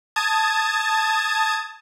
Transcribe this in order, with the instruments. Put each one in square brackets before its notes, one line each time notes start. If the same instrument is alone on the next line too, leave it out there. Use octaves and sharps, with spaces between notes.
[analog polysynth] A5 D#6 G#6